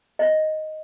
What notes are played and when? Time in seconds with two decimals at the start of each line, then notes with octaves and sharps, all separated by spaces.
0.19 D#5